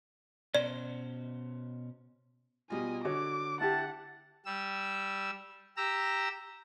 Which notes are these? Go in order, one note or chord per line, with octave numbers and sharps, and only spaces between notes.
B2 C#4 C5 D5
B2 G3 F4 D#5 G#5
D3 F#4 C#5 D6
E4 G4 F#5 A5
G3 E6
G4 A#5 E6